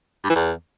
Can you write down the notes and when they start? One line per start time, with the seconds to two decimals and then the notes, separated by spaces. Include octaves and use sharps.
0.24 G2
0.30 E3
0.35 E2